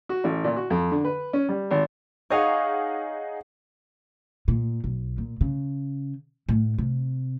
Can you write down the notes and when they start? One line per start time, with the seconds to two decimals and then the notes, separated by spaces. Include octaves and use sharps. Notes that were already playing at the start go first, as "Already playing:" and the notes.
0.09 F#4
0.24 A1
0.44 A#2
0.56 F#4
0.70 F2
0.91 D3
1.05 B4
1.33 C#4
1.49 G3
1.71 G#1
2.30 D#4 G#4 C#5 D#5 F5 F#5
4.48 A#2
4.84 B1
5.18 A#2
5.41 C#3
6.49 A2
6.78 C3